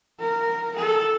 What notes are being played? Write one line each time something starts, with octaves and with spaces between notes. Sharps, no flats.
A#4
A4